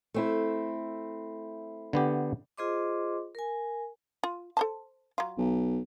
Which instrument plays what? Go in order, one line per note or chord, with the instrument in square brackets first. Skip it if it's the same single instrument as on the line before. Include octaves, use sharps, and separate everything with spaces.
[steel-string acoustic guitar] A3 C4 E4
[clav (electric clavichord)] D3 B3 G4
[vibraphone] F4 G#4 C5 D#5 C6 D6
A#4 G#5
[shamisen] F4
A4 C5 A5
F#3 F4
[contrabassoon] B1